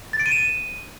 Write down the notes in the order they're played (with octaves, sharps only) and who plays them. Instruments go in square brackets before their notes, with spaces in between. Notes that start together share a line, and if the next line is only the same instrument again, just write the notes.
[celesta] A6
D7
D#7
E7
D#7